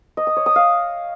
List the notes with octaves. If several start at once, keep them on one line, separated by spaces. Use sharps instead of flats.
D#5
D#6
C#5
D#6
F5